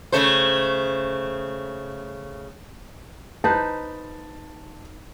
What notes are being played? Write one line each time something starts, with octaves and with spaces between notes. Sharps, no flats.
C#3 A3 C5
D#4 B4 C5 A5